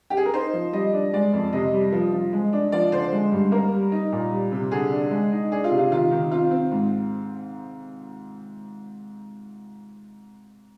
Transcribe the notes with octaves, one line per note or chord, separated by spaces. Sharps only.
G4
G#4
A#4
D#4 C5
F3
G3 D#5
D4
G#3 D5
F2
C3 D#5
G3
F3
F3
G#3
D4
F3 D5
D3 C5
G#3
G2
A#3 A#4
G3
D#4
A#2
G3
C3
D3 G#4
D4
G#3
D#4
D4 G#4
F4
C3
F4
D#3 F4
D#3
C4 F4
C4
G#2